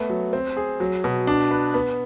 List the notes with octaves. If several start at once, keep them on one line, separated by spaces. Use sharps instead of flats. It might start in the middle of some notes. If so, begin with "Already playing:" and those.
Already playing: A3 B3
F#3
C4
G#4
F#3
B2
D4
B4
B3